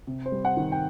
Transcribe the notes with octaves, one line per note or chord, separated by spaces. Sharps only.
C3
C5
G3
F#5
D#3
G5